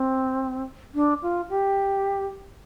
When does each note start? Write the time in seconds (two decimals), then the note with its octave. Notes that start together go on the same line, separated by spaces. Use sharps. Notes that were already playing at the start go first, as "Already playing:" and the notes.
Already playing: C4
0.95 D4
1.22 F4
1.49 G4